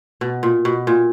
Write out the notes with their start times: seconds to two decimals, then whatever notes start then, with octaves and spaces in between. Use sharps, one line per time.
0.21 B2
0.43 A#2
0.65 B2
0.87 A#2